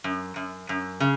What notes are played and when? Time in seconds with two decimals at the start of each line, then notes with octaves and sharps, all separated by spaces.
0.04 F#2
0.36 F#2
0.69 F#2
1.00 C#3